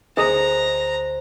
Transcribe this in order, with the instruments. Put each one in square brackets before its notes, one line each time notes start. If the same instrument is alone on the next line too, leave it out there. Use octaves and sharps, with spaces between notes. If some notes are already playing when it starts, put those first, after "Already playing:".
[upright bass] D2 [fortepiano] G#4 D#5 D#6 [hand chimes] C5 [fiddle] A#5